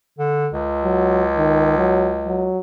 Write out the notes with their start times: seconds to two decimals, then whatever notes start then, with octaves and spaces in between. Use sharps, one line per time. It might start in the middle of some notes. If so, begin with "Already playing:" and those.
0.19 D3
0.53 C#2
0.84 F#3
1.37 D#3
1.78 F#3
2.27 F#3